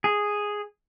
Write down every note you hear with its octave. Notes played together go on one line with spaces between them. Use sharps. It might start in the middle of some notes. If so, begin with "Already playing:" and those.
G#4